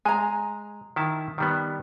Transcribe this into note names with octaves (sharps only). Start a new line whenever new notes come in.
G#3 G#5 A#5
D#3 E4 A5
D#3 G3 B3